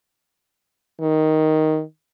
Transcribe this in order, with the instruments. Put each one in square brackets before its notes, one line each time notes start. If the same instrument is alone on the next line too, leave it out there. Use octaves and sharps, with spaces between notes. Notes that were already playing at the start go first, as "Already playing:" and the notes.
[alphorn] D#3